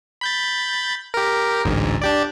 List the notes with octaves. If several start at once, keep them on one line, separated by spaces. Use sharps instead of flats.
B5 G6 A6
G4 A#4
A1 D2 G#2
D4 G4 D5